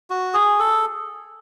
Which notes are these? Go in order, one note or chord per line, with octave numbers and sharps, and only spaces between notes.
F#4
G#4
A4